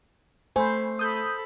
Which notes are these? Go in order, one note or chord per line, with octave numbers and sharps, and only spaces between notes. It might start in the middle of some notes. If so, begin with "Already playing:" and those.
A3 C5 G#5 B5
A4 B5 D#6 G6